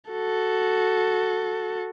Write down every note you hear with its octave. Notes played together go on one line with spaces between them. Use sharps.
F#4 A4